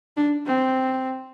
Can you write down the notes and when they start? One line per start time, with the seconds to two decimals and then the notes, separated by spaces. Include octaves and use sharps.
0.17 D4
0.46 C4